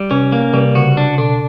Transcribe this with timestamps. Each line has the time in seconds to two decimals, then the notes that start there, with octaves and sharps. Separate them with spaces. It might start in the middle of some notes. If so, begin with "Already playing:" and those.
Already playing: G3
0.11 C3 C#4
0.32 A#3
0.53 C3 G3
0.75 C#3 F#4
0.97 D4
1.18 B2 D4